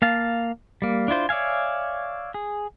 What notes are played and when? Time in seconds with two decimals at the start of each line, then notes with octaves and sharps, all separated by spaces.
0.02 A#3 F5 A5
0.82 G3 A#3
1.08 D4 E4 F4 C5
1.29 C#5 D5 E5 F5 G#5
2.34 G#4